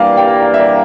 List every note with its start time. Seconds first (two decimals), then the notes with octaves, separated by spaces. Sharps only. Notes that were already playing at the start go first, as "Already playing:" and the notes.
Already playing: G2 E3 G3 A#3 D5 F5
0.17 G5
0.41 F5
0.54 E5
0.60 D5